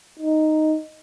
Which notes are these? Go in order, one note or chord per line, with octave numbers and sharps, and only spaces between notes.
D#4